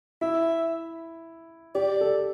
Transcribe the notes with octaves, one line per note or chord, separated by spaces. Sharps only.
E4 E5
G4 D5
A4